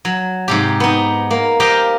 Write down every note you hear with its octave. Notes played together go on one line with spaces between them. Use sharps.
F#3
G#2 C3 G4
B3 D#4
A#3
G4 A#4 C5 D#5 F5 G5